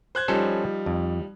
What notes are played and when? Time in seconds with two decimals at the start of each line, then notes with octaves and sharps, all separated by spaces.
0.15 C5 F#6 G#6
0.28 F3 G3 C#4 D#4 A4 C5
0.86 F2